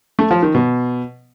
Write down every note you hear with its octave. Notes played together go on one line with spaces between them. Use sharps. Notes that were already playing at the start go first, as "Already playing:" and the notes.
A3
F3
D#3
B2